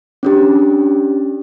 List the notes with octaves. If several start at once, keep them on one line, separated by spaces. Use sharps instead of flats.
C#4 D4 G4